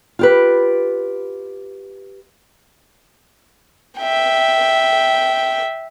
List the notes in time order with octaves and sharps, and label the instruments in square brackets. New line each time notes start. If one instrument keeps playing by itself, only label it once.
[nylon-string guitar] F4 G4 B4
[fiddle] E5 G5